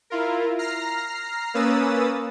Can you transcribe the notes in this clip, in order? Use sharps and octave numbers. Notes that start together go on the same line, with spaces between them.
E4 F4 A#4
A#5 F6 A#6 C7
A#3 C#4 B4 D#6 E6 A6